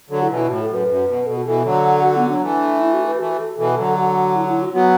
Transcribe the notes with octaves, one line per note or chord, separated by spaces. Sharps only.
D3 F#3 A4
E4
B2 E3
E4
A2 F#4
A4
F#2
B4
F#2
B2
B2 A4
F#4
B2 E3 A4
D3 F#3
F#4
B3
F#3 D4
E3 A3
E4
F#4
B4
E3 A3 F#4
A4
B2 E3 A4
D3 F#3 A4
F#4
E4
E4
F#4
F#3 B3 F#4